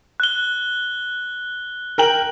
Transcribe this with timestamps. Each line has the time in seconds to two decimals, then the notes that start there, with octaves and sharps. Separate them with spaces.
0.20 F#6 G7
1.98 A#4 G5 F#7